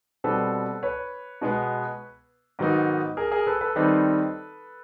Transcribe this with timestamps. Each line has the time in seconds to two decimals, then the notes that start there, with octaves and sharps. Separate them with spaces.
0.24 B2 G3 C4 A4 B4
0.83 B4 C#5
1.41 B2 G#3 B3
2.59 G#2 D#3 F#3 B3 D#4
3.17 G#4 A#4
3.31 G#4 A#4
3.47 A4 B4
3.61 A4 B4
3.76 D#3 G3 C4 D#4 A4 B4